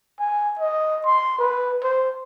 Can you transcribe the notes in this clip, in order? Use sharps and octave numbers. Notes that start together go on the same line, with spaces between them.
G#5
D#5
C6
B4
C5